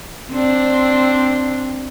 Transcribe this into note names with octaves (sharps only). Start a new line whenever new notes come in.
C4 D4